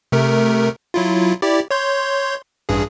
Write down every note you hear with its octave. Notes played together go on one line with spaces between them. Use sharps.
C3 A3 A#4
F#3 E4 F4
E4 G4 D5
C#5 C6 G6
A1 G2 G#4